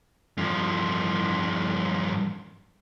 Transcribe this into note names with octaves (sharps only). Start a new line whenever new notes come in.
G2 F3